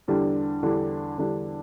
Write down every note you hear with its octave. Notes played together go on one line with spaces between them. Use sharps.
E2 D3 G3 D4
E2 D3 G3 D4
E2 D3 G3 D4